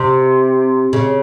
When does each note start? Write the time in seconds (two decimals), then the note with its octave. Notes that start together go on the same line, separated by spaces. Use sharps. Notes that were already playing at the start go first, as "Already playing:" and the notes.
Already playing: C3
0.93 C#3